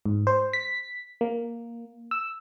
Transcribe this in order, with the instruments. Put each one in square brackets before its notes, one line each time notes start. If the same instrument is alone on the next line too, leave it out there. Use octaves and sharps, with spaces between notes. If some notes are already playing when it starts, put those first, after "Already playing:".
[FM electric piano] G#2
C5
B6
A#3
E6